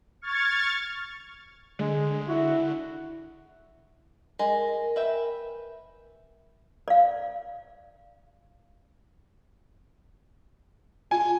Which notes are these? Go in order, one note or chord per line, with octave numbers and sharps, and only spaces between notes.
C#6 F6 G#6 A6
D3 G#3
E4 F#4
G#3 A#4
B4 E5 G5
D5 F5
F4 G#5